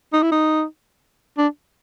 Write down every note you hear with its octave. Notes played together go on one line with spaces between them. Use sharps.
D#4
E4
D#4
D4